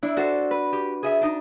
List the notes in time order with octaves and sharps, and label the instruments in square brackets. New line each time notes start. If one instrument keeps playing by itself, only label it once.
[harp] D4 [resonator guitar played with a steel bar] E4
[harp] F#4 [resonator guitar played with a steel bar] A4 C5
[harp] B4
[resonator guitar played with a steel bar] G4
G#4 D#5 E5
D4 D#4